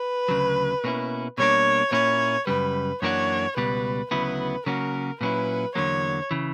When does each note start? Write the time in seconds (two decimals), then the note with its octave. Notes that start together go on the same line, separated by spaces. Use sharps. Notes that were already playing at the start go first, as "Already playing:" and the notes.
Already playing: B4
0.29 D2 C#3 F#3
0.84 B2 A#3 C#4 E4
1.38 B2 G3 A#3 D4 C#5
1.92 A#2 A#3 C#4 E4 C#5
2.47 F#2 C#3 G3 B4
3.02 F#2 E3 A#3 D4 F#4 C#5
3.57 C#2 B2 G3 B4
4.11 D2 C#3 F#3 B3 E4 B4
4.66 C#3 F#3 A#3 C#4 F#4 A#4
5.21 A#2 F#3 C#4 E4 B4
5.75 E2 D3 F#3 A#3 C#5
6.31 C#3 E3